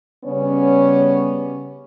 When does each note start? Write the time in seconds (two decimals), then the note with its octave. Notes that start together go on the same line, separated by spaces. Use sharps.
0.25 C#3 G3 B3 C#4